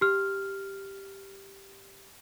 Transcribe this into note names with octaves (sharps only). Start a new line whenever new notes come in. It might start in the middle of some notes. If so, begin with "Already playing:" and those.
G4 F6